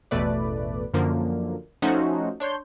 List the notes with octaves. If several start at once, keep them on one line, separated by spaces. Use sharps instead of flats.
A1 E2 B2 A3 B4 D5
F#2 D3 F3 A#3
F3 A3 C#4 D#4 F#4 C5
D4 C#5 C6 G6